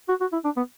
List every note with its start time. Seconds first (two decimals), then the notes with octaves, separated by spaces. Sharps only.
0.09 F#4
0.21 F#4
0.33 E4
0.44 D4
0.57 B3